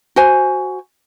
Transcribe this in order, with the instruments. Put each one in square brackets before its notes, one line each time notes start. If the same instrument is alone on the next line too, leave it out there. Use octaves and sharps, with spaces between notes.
[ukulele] F#4 C5 G#5